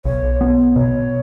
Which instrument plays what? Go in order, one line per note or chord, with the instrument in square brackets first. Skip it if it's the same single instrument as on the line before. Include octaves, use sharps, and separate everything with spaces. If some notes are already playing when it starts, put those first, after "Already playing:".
[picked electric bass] B1 [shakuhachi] C#5
[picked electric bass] B3
[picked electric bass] B2 [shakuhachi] C#5